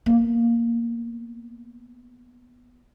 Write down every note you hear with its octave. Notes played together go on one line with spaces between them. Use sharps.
A#3 B3